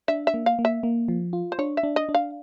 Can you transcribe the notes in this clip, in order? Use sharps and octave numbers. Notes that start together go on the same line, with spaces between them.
D4 E5
E5
A#3
F5
A#3
E5
A#3
F3
F4
C5
D4 C#5
E5
D4
D#5
D4
F5